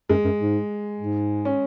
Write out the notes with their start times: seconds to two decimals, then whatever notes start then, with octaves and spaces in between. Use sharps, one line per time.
0.09 F#2 G#3
0.25 F#2
0.39 G#2
1.00 G#2
1.45 C#4